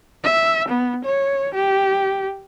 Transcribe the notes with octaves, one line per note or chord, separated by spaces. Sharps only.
E5
B3
C#5
G4